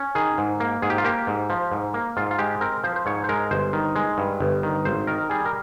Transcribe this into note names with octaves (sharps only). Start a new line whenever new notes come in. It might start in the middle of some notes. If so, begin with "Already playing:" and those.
Already playing: C#4
D#3 G#4
G#2
A#3
G#2 G#4
G4
F4
A#3 G4
G#2
F3
G#2
A#3
G#2 F4
F4
G#3 G4
C4 A#4
F3 C5
C5
G#2 C#5
C5
G#3 A#4
G1 C5
D#3
G#3
G2
G1
D#3
G#1 C5
D#3 A#4
G3 G#4
A#4